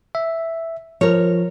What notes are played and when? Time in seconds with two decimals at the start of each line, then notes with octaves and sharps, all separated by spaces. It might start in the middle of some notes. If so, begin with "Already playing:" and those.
0.15 E5
1.01 F3 A#4 C#5